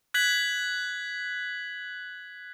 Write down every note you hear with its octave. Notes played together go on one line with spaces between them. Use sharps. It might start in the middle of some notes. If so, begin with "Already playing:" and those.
F#6 G#6 B6 F#7